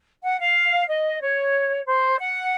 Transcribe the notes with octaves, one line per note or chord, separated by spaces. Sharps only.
F#5
F5
D#5
C#5
C5
F#5